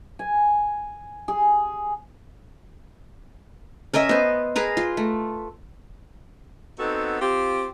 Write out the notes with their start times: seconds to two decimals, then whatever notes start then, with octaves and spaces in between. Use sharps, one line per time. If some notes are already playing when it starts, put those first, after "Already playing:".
0.19 G#5
1.28 G#4
3.94 C#4 A#4 D#5 E5
4.09 B3 C5
4.56 G#4 A#4 B4 A#5
4.77 F4
4.97 A3
6.79 B3 C4 D#4 F#4 A4
7.20 C4 F4 G4